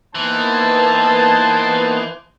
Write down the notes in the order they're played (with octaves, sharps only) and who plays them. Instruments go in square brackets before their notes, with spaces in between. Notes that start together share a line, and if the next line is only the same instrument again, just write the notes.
[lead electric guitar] E3 [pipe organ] A#3 B3 D#4 [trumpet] C5 [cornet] A5